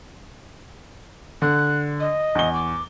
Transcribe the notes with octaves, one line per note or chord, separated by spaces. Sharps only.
D3 F#6
D#5
E2 G7
D6